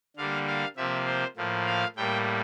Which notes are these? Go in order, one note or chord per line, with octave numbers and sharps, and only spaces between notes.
D3 G3 A#3 F5
F5
C3 F3 A#3 E5
C5
A2 F3 A#3
F5
A2 G3 A#3 G5